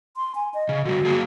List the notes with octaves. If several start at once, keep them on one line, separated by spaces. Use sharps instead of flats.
C6
G#5
D#5
C#3
D3 G3 F#4
F#3 A#3 G#4